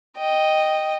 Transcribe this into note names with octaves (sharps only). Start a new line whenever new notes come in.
D#5 G5